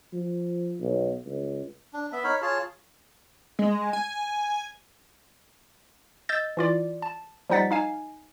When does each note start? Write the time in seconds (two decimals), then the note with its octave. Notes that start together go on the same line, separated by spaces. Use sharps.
0.13 F3
0.81 B1
1.26 C#2
1.93 D4
2.12 B3 E5
2.24 D#4 A#4 C#5 B5
2.42 F4 G#4 C#5 A5
3.59 G#3
3.93 G#5
6.29 D#5 E6 G6 A6
6.57 E3 F4 D5
7.02 A5
7.50 F3 G3 D#4 F#5 A6 B6
7.71 D#4 F5 G#5